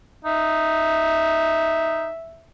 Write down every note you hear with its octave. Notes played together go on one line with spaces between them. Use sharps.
D#4 E5